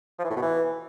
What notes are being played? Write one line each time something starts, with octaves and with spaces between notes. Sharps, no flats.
F3
E3
A2
B2
E3